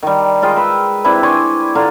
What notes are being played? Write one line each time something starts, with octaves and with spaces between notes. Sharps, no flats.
D#3 G3
G#3 F4 D#5 G5
B4 E5
C3 D4 E4 B4
D5 G#5 C6 C#6
D3 F4 A#5